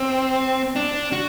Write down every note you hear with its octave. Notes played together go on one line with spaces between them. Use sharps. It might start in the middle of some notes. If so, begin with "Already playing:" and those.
Already playing: C4
D4
F#4